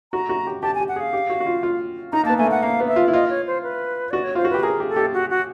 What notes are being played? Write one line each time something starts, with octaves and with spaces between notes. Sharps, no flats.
F#4 A#5
F#4
G4
G4 A5
G#5
G4
F#5
G#4 F5
G4
F#4
F#4
F4
F4
D#4 A#5
A#3 A5
B3
A3 G#5
A#3 F#5
A#3 F5
B3
E5
F4
E4
F4 D#5
C#5
C5
B4
F#4 D5
C#5
F4 C5
F#4
G4 B4
G#4 A#4
G4
A4
G4
F#4
F#4